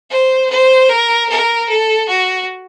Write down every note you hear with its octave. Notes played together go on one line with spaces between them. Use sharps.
C5
C5
A#4
A#4
A4
F#4